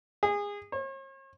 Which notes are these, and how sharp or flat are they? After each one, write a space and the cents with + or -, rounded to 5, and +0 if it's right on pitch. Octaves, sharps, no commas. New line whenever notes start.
G#4 -25
C#5 -45